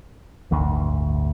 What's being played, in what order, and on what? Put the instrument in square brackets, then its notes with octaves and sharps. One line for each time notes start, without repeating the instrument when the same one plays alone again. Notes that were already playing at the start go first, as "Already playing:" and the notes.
[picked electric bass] D1 G1 D2